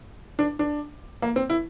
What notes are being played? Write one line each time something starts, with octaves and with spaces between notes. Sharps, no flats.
D4
D4
A#3
C4
E4